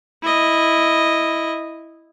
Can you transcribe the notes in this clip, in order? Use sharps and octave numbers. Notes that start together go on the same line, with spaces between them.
E4 D#5